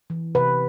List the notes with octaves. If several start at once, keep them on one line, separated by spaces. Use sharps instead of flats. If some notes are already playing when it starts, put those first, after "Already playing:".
E3
C3 B4